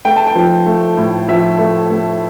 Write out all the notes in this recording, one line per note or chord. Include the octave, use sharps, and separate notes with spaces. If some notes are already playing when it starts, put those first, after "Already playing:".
A3 G5
A5
G5
F3
A3
A2
F3 E5
A3
A3